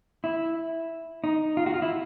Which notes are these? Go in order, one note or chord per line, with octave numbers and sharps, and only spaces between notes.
E4
D#4
F4
F#4
F4
E4